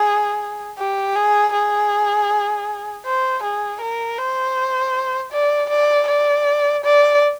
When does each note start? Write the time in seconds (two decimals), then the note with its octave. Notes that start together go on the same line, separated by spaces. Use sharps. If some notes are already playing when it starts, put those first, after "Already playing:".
Already playing: G#4
0.78 G4
1.15 G#4
1.53 G#4
3.06 C5
3.44 G#4
3.81 A#4
4.18 C5
5.32 D5
5.70 D5
6.08 D5
6.84 D5